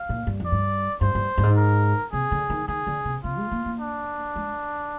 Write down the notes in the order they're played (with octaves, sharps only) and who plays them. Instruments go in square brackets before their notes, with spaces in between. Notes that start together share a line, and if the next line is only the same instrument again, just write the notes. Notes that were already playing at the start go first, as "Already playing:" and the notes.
Already playing: [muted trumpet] F5
[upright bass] A#2
G2
F2
[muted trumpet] D5
[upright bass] G2
[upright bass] G2 [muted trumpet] C5
[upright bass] G2
G2
G#2
[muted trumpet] A#4
[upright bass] C3 [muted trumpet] G#4
[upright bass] D3
D#3
[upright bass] D#3 [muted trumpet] G#4
[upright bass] D3
C3
[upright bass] C3 [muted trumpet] F4
[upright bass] G#3
A#3
A#3
[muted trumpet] D4
[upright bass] G#3